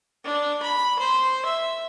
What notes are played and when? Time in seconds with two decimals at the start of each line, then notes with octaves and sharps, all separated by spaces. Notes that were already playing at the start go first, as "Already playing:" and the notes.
0.24 D4
0.62 B5
0.99 C5
1.45 E5